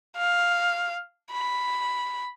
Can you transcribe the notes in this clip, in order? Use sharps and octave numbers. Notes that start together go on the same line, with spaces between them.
F5
B5